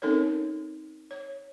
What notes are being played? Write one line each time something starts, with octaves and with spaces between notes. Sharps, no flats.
C4 C#4 D#4 A4 A#4 C#5
C#5